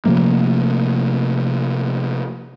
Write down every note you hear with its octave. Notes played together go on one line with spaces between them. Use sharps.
C3 F3 A3 A#3